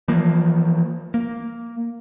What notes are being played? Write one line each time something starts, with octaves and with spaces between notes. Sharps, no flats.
E3 F3 A#3
A#3